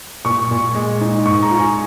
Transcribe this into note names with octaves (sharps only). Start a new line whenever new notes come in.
A#2 C#6
A#2
G#3
D#4
G#2 C#6
A#5
F4
G#5